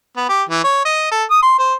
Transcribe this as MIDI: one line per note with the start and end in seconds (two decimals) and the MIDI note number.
0.17 0.25 59
0.29 0.43 67
0.49 0.63 52
0.64 0.81 73
0.85 1.07 75
1.11 1.24 69
1.30 1.42 87
1.43 1.57 84
1.59 1.74 72